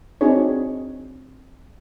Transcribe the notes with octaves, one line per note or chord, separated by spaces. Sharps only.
C4 D4 D#4 F#4 G#4 C#5